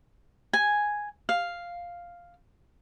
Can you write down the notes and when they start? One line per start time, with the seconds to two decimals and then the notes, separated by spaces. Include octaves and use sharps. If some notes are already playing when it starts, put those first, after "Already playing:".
0.53 G#5
1.29 F5